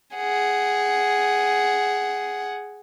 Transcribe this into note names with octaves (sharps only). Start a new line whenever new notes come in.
G#4 F#5